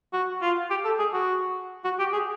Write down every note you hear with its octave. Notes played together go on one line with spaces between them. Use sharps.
F#4
F4
G4
A4
G#4
F#4
F#4
G4
G#4